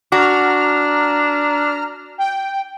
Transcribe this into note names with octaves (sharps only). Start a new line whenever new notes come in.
D4 F#4 A#5 F6
G5